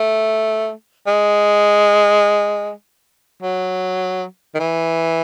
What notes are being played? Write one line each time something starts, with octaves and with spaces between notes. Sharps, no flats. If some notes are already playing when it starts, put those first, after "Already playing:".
Already playing: A3
G#3
F#3
D#3
E3